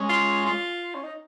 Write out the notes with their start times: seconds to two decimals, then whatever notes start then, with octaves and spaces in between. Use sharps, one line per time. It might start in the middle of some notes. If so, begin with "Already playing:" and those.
Already playing: G#3 C#4
0.09 F4
0.46 F4
0.95 C#4
1.04 D#4